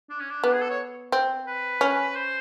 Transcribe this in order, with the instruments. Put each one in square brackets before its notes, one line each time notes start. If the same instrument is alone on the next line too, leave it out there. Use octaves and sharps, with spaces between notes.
[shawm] D4
C#4
D4
[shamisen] B3 [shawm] D4
[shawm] G#4
A4
C#5
[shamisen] C4
[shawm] B4
[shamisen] C#4
[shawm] C5